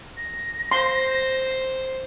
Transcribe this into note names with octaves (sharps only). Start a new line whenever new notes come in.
A#6
C5 C6